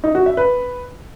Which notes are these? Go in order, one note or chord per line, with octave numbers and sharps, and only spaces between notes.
D#4
F#4
E5
B4